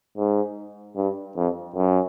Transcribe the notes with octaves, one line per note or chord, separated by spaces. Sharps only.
G#2
G2
F2
F#2